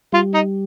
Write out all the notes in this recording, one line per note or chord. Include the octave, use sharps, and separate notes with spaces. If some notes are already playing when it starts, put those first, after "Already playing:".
G3 F4
D#4